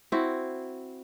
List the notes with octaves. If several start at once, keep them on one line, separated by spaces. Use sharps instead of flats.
C4 E4 F#4